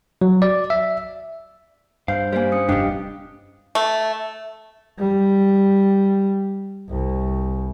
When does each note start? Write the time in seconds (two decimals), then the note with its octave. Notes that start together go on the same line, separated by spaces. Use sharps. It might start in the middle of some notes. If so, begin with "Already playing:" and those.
0.22 F#3
0.42 D5
0.70 E5
2.08 G2 C5 F5 G6
2.33 G3 A#3 C5 F5 G#5
2.52 C#4 D#6 C#7
2.69 F1 G2 G3 D4 G4 D#5 F5 G5
3.75 A3
4.99 G3
6.89 C2